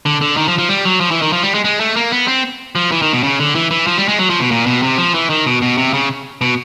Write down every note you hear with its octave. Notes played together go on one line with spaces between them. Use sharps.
D3
D3
D#3
F3
F3
G3
F#3
F3
E3
D#3
F3
G3
G#3
G#3
A3
A#3
B3
C4
F3
E3
D#3
B2
C#3
D3
E3
E3
F3
G3
G#3
F#3
F3
B2
A#2
B2
C3
F3
E3
D#3
B2
B2
C3
C#3
B2